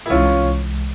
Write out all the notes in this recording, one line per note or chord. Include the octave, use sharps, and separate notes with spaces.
E4
C2 C3 E3 G#3 C#4 F4